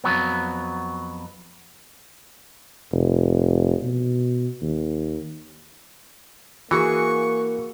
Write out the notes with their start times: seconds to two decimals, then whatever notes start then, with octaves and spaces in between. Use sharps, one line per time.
0.04 F2 F#3 B3
2.92 F1
3.82 B2
4.62 D#2
6.71 E3 A#3 F#4 G#4 C#6